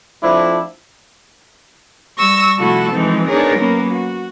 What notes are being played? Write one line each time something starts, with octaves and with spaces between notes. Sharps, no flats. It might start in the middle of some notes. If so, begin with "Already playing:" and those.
F3 A3 C4 D4 E4
G3 C#6 E6 A#6
C3 F3 A3 E4 F#4 A4
E3 F3 G#3 C4 D#4
B3 D4 D#4 G#4 A#4 C#5
F#3 A#3 B3 C#4 A#4
F#4